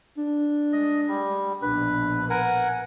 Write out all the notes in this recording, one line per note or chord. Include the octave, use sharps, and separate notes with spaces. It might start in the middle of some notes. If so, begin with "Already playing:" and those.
D4
G#3 D#5
G3
A#1 B2 D4 B4
A#4 B4 F#5 G#5